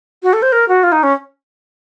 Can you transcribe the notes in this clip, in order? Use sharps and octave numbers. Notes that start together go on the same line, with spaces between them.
F#4
A4
C5
A#4
F#4
F4
D#4
C#4